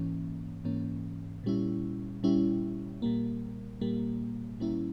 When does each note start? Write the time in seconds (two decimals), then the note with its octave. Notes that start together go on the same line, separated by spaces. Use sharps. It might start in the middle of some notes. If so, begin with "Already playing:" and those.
Already playing: G#2 E3 A#3 C#4
0.65 G#2 E3 A#3 C#4
1.44 A#2 G3 C#4 E4
2.23 A#2 G3 C#4 E4
3.02 A#2 G3 A#3
3.81 A#2 G3 A#3
4.60 A#2 G3 A#3 C#4 E4